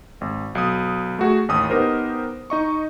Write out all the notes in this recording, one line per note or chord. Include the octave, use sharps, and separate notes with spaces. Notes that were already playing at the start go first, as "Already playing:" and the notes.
G#1
B1 D#6
A3 F#4 G#4
A1 D#2 D#6
B3 D#4 G4 A#4 C5
D#4 D#5 C#6